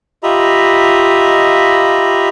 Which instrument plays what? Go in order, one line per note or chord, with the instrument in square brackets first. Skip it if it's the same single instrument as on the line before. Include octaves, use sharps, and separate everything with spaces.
[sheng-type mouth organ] F4 G4 D#5 E5 A#5 B5